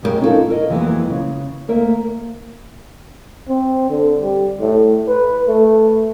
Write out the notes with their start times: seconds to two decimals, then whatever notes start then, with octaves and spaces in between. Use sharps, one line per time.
0.03 F#2 G#3 E4 G4 A#4
0.21 C#4 D#4 F4 F#4 A4 A#4
0.48 E4 A#4 D#5
0.69 F2 E3 F#3 G#3 A#3 B3
1.10 C#3
1.68 D2 A#3 A#4 E5
3.49 C4
3.90 D3
4.22 G3
4.61 A2
5.08 B4
5.48 A3